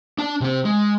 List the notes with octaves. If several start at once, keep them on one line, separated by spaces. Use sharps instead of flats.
D4 A5
C3 C4
G#3